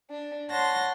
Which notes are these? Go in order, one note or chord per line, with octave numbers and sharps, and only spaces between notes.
D4
C#5 F#5 A5 C6 A#6